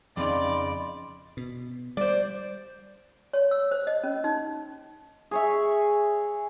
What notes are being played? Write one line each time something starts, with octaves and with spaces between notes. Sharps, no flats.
F2 C#3 D#4 D5 D#5 B5 C6
B2
G3 C5 D5
C#5
E6
C5
D#5
C#4
D#4
G#4 C#5 E5